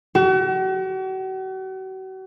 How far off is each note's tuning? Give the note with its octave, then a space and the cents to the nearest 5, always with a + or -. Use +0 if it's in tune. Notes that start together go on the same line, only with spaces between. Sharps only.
F#4 +40